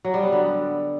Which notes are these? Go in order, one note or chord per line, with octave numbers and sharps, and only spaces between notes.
F#3
G3
B3
D3